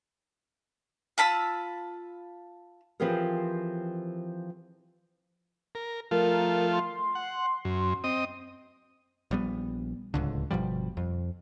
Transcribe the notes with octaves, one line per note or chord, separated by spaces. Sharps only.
F4 A5 B5 E6
E3 F3 C4 G4 G#4 A#4
A#4
F3 A3 F4 A#4
C6
F#5
F#2
C4 D#5 D#6
A#1 G3 B3
D1 C#2 D3
G1 B2 F3 G3
F2